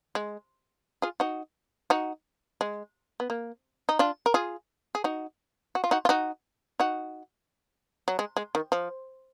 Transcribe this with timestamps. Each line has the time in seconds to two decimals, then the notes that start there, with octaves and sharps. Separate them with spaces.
0.15 G#3
1.02 F4 G#4
1.20 D#4 F#4
1.90 D#4 F#4
2.61 G#3
3.20 B3
3.30 A#3
3.89 D#4
3.99 D4 F4
4.26 A#4
4.34 F4 G#4
4.95 G#4
5.04 D#4 F#4
5.75 F#4
5.84 F4
5.91 D#4 F#4
6.05 F4
6.09 D#4 F#4
6.80 D#4 F#4
8.08 F#3
8.19 G#3
8.37 G#3
8.55 D#3
8.72 F3